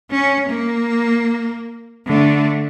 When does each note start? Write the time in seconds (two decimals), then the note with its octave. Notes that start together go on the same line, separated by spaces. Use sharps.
0.11 C#4
0.50 A#3
2.06 D3 A3